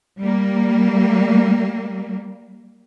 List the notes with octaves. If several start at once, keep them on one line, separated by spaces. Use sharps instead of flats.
G3 A#3